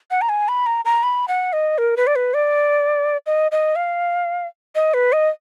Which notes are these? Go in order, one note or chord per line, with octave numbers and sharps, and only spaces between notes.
F#5
A#5
G#5
B5
A#5
A#5
B5
F#5
D#5
A#4
B4
D5
B4
D5
D#5
D#5
F5
D#5
B4
D#5